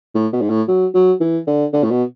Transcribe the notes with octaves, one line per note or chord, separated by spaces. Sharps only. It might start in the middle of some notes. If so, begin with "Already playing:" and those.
A2
B2
G#2
A2
F#3
F#3
E3
D3
D3
A2
B2